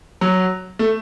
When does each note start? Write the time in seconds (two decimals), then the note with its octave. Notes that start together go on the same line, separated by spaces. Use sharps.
0.21 F#3
0.79 A3